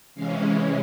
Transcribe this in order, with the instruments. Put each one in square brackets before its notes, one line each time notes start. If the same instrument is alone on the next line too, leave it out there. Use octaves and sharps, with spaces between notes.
[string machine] C3 E3 G#3 C#4 F5